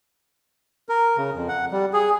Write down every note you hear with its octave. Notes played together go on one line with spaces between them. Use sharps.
A#4
C#3
F2
F#5
G3
G#4